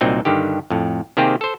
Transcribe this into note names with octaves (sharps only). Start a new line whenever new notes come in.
C2 A#2 F#3 C4 D#4
G2 D3 D#3 G4
F2 A2
C3 D#3 A#3 C4 G4 G#4
A4 C5